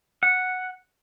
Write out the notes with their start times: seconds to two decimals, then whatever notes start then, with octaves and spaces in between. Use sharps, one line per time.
0.23 F#5